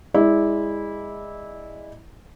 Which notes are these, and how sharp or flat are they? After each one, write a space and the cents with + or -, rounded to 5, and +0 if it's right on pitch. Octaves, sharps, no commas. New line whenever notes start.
G#3 -20 E4 -15 D5 +0